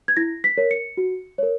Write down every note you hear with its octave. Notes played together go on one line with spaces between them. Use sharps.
G#6
E4 A#6
B6
A#4 C#5
C#7
F#4
A#4 C#5